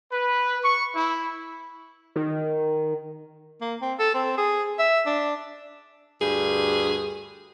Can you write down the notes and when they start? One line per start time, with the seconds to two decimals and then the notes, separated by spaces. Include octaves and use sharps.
0.13 B4
0.63 C#6
0.95 E4
2.16 D#3
3.61 A#3
3.82 C4
4.00 A4
4.14 C4
4.38 G#4
4.79 E5
5.06 D4
6.22 D2 G2 G#4